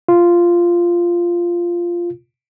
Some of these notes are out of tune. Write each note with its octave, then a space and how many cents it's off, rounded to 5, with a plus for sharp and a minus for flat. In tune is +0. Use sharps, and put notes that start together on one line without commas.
F4 -10